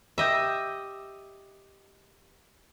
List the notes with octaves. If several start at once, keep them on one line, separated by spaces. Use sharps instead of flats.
G4 D#5 E5